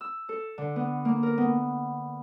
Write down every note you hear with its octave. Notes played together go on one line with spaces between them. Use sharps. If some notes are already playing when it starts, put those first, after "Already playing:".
E6
A4
D3
B3
A#3
A#4
B3